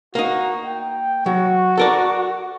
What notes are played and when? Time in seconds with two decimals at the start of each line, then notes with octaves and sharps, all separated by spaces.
0.15 A#3 D#4 F#4
0.65 G5
1.26 F#3 F#4
1.78 A4 A#4 D5